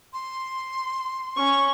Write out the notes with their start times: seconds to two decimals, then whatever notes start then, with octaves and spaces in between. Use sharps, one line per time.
0.13 C6
1.37 C#4 C#6